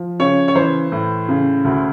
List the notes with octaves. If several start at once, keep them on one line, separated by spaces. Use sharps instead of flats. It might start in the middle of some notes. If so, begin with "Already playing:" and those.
Already playing: F3
C#3 C#5
C#5
E3 C5
A2
C#3
D2